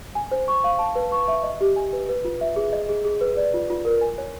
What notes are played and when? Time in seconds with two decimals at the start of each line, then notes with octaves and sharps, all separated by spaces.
0.15 G#5
0.31 C5
0.48 C#6
0.64 F5
0.79 A5
0.95 B4
1.12 C#6
1.28 E5
1.43 D#5
1.61 G4
1.76 G#5
1.93 B4
2.09 B4
2.25 F4
2.41 E5
2.56 G#4
2.73 D#5
2.89 G#4
3.05 G#4
3.21 B4
3.37 D5
3.54 F4
3.70 F4
3.85 A#4
4.01 G#5
4.18 C#5